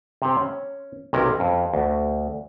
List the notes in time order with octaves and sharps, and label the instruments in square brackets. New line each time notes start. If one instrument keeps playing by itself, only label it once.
[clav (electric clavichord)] C3 C4
C#4
B1 C3 C#4 A#4
F2
D2